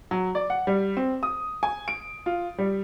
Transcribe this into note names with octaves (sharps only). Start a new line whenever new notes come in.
F#3
D5
F#5
G3
C4
D#6
G#5
D7
F4
G3